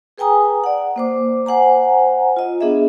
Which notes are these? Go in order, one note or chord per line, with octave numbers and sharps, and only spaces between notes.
G#4 B4 G5 G#5 A#5 D#6
D5 F#5
A#3 C5 D6
C5 F#5 G#5 A#5
F4 D#5
B3 D4 G#4 D#5 E5